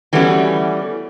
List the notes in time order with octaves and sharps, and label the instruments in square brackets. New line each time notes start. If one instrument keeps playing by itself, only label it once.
[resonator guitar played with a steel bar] E3 G3 A3 B3 C#4 F#4